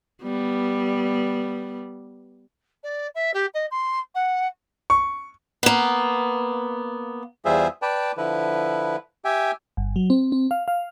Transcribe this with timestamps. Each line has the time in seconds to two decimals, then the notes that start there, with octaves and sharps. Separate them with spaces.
0.22 G3 B3
2.83 D5
3.15 E5
3.34 G4
3.54 D#5
3.71 C6
4.15 F#5
4.90 C#6
5.63 A#3 B3
7.45 E2 G3 F4 G#4 C5 E5
7.82 B4 D5 G5 A5
8.17 D3 F3 E4 B4
9.25 G4 E5 G5 G#5
9.77 G1
9.96 F#3
10.10 C4
10.32 C4
10.51 F5
10.68 F5